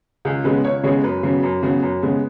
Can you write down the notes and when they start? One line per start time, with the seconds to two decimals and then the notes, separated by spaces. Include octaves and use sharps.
0.25 C#2 G#4
0.44 C#3 G#3 B3 B4
0.64 C#2 C#5
0.83 C#3 G#3 B3 C#5
1.03 F#2 B4
1.23 C#3 F#3 B3
1.43 F#2
1.63 C#3 F#3 B3
1.82 F#2
2.02 C#3 G#3 B3